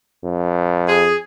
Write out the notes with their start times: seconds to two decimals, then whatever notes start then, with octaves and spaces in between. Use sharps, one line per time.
0.24 F2
0.87 G#4